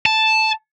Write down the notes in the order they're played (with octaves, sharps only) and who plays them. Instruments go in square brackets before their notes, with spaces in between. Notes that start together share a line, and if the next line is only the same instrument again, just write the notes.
[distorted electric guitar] A5